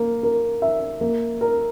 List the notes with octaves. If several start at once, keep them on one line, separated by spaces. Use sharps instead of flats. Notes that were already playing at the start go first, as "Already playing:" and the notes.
Already playing: A#3
A#4
E5
A#3
A#4